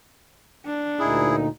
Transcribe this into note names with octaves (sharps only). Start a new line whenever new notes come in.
D4
D2 A#2 D#4 E4 G#4